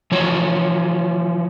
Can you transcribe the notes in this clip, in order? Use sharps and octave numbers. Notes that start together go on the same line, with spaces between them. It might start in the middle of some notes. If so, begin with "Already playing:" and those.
E3 F3 C#5